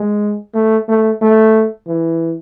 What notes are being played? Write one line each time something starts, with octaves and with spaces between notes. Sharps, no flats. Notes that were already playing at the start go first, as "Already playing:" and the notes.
Already playing: G#3
A3
A3
A3
E3